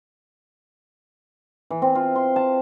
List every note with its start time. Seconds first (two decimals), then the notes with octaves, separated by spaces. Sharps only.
1.71 E3
1.82 C4
1.95 F4
2.16 C6
2.36 A5